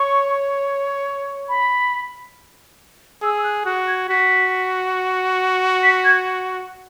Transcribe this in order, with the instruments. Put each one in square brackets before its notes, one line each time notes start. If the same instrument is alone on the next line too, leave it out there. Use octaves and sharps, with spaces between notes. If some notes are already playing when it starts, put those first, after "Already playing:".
Already playing: [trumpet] C#5 [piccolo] C#6
[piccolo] B5
[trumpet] G#4 [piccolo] E6
[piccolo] E6
F#6
[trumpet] F#4 [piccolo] F#6
[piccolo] G#6
[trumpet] F#4 [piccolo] B6
[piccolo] B6
G#6